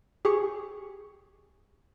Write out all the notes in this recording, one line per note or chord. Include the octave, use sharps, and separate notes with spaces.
G4 G#4 G#5 C#6